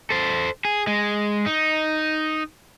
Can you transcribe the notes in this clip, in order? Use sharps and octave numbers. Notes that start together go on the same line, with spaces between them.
A4 C5
G#4
G#3
D#4